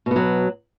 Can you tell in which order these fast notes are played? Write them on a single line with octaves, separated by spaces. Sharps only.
B2 B3 F#3